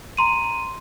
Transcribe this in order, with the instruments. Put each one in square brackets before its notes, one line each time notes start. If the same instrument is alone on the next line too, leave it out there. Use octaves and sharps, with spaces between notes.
[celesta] A#5 C6 D#7